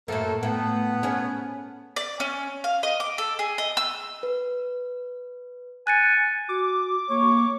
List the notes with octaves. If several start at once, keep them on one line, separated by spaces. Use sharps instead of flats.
F#2 A2 A#3 A4
A2 B3
C#4 G#4
D5
C#4
F5
D#5
D6
A4
G#4
D#5
E6
B4
G#5 F#6 A6 C#7
F#4 D6
A#3 C#5